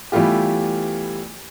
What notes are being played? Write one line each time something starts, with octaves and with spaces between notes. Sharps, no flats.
E3 G3 A3 B3 F4 G4